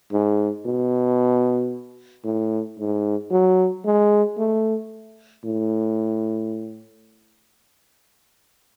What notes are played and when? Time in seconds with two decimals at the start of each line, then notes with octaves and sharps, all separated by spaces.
0.12 G#2
0.66 B2
2.25 A2
2.79 G#2
3.31 F#3
3.86 G#3
4.38 A3
5.44 A2